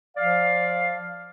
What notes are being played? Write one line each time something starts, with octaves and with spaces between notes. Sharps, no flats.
F3 D5 F5